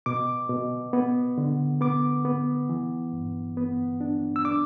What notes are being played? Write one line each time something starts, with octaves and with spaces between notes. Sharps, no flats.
B2 D6
B2
B3
D3
B3 D6
B3
E3
G2
B3
D4
E6
D4 D6